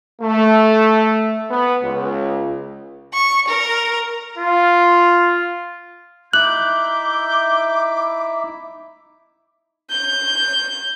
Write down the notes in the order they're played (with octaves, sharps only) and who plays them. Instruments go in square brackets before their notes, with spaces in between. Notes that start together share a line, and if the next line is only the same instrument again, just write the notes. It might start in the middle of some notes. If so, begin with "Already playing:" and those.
[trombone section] A3
B3
C#2
[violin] C#6
A#4
[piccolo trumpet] F4
[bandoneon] D#4 E4 E5 [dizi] D6 [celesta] F#6 F#7 [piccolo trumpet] G6
[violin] G6